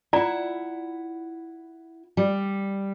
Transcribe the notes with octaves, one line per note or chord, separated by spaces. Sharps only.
E4 F4 D5 F#5 A#5
G3